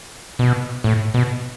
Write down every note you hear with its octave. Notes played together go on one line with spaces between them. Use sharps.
B2
A2
B2